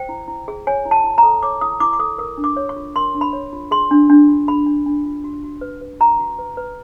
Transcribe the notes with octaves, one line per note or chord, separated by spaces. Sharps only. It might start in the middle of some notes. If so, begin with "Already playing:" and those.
Already playing: C5 G5
E4
E4
G#4
C#5 G#5
E4
A5
E4
A#5
A4
C#5 D6
E4 D#6
E4 D6
D6
A4 D#6
A#4 D#6
D4
D6
C#5
C#6
F4
A#4 C6
D4
B5
C#5
F4
G#4 C6
D4
D4
F4
G#4 B5
D4
D4
F4
F#4
F#4
B4
B4
F#4 A#5
F#4
B4
B4